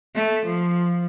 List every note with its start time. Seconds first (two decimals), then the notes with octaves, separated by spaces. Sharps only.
0.15 A3
0.46 F3